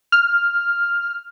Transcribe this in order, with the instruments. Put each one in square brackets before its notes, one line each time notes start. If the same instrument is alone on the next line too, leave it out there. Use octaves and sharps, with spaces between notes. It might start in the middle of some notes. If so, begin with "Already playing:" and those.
[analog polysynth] F6